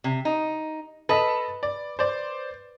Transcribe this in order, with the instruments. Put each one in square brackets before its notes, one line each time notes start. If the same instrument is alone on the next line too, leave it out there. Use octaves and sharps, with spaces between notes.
[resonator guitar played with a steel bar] C3
D#4
[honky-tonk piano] A4 D#5 A5 [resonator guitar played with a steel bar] B4
[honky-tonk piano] D5
C5 D5